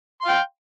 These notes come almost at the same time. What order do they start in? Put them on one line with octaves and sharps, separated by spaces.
C6 F5 G5